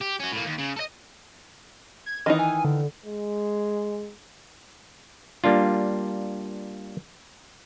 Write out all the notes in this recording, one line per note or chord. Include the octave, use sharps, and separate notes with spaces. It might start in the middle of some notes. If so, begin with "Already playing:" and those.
G4
C#4 F#4
A2 A#3
D#2
C#3
A4 D#5
G#6
D#3 E3 D#4 D#5
G#5
D3
G#3
G3 A#3 D4 F4